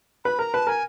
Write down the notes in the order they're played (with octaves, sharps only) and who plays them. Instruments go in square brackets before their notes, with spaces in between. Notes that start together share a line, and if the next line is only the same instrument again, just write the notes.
[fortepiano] B4 [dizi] B5
[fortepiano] A#4 [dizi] A#5
[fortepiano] B4 [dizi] A5
[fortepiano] A#4 [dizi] G#5